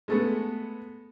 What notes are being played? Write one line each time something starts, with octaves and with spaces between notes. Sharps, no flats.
G#3 A3 B3